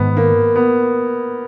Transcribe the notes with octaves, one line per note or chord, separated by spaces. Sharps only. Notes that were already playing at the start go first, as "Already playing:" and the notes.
Already playing: G#2 D#3 G#3 B3
A#3
B3